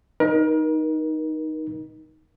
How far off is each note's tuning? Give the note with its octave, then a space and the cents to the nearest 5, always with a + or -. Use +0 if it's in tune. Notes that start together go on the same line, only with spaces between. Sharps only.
D#4 +0 A#4 +35